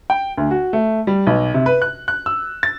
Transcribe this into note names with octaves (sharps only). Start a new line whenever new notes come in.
G5
D2
F#4
A3
G3
B1
C3
B4
F#6
F#6
E6
A6